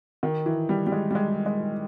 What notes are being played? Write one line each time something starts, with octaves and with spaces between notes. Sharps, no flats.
D#3
E3
G3
G3
G#3
G3
G#3
G#3